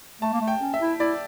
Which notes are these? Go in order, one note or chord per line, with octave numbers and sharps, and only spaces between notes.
A3 A5
A#3
A3
G5
C#4
E5
E4
E4 D5